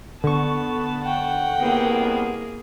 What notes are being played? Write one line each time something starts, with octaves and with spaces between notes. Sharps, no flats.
D3 B3 A5 C#6
F#5 G5
C2 A#3 B3 G#4